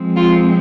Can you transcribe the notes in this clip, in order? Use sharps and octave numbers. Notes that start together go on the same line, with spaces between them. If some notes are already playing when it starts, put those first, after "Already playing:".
Already playing: F3 G#3 C4
F4